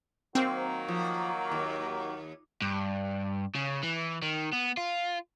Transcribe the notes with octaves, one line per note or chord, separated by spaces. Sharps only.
D#3 F#3 A#3 C4
F3
D#2
G2
C#3
E3
D#3
B3
F4